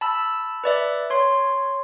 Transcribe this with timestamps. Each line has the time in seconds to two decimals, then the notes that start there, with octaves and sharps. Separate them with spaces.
0.01 A5 B5 E6
0.64 B4 D5 E5
1.10 C#5 C6